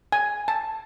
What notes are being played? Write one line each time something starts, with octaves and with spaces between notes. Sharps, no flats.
G#5
A5